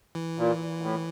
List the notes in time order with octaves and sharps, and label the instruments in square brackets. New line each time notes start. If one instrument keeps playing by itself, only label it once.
[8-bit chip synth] E3
[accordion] A#2
A2